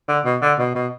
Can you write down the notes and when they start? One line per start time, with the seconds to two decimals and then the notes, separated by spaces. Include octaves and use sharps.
0.08 D3
0.25 B2
0.42 D3
0.59 B2
0.75 B2